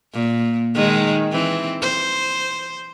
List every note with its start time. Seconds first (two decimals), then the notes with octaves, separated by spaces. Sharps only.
0.13 A#2
0.75 D#3 G#3
1.31 E3 C4
1.81 C5